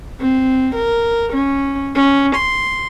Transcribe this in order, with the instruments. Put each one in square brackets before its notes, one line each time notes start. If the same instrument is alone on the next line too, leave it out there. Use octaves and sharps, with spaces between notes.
[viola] C4
A#4
C#4
C#4
C6